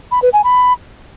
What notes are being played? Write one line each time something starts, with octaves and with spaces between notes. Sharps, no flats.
B5
B4
G#5
B5